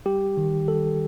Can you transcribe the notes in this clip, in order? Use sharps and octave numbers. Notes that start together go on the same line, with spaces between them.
G3 G4
D#3
G3 A4